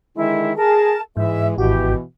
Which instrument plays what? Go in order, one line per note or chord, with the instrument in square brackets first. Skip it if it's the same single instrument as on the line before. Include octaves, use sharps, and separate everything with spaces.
[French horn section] D3 D#3 G#3 [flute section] E4
[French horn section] G#4 [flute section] A#4 A5
[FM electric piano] G#2 [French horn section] E3 G#3 [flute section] E5
[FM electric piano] G#1 F#4 [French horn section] B2 E3 [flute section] G4